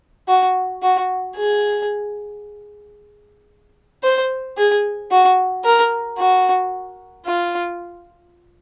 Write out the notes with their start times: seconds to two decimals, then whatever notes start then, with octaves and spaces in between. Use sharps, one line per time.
0.28 F#4
0.82 F#4
1.36 G#4
4.04 C5
4.57 G#4
5.11 F#4
5.64 A#4
6.18 F#4
7.25 F4